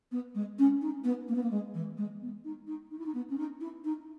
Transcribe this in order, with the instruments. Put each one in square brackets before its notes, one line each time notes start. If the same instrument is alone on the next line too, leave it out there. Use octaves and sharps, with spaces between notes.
[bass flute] B3
G#3
C#4
D#4
B3
A#3
B3
A#3
G#3
E3
G#3
B3
D#4
D#4
D#4
E4
D#4
B3
C#4
D#4
E4
D#4